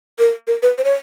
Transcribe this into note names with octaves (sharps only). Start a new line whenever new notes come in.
A#4
A#4
B4
C5
C#5